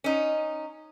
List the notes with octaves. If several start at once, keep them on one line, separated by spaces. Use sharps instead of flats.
C#4 D#4